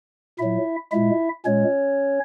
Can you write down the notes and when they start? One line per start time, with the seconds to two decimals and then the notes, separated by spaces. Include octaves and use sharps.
0.39 A#2 F#3 E4 E5
0.92 A#2 G#3 E4 E5
1.45 A#2 G#3 C#4 C#5